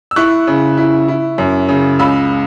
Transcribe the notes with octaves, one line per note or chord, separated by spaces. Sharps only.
E6
E4 C#6 F#6
C#3
E4
E4
F#2
C#3
C#2 B5 E6